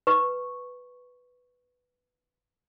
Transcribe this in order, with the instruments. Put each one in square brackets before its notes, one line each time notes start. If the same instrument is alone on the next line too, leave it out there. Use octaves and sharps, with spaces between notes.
[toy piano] B4 C#6